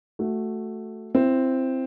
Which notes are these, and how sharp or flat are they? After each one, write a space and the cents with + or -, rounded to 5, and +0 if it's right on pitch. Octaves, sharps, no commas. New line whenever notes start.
A3 +0 F#4 +0
C4 +0 E4 +25